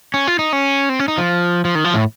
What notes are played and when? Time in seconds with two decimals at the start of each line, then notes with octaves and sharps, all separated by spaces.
0.14 C#4
0.27 F4
0.39 D#4
0.53 C#4
0.89 C4
0.99 C#4
1.08 D#4
1.18 F3
1.65 F3
1.75 D#3
1.84 F3
1.94 A2